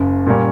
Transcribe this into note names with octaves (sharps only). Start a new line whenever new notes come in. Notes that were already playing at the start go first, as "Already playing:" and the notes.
Already playing: F#1 F#2 C#3
A#2 G3 A#3 C#4